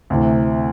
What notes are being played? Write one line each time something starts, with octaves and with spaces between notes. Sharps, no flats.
D2 C3 E3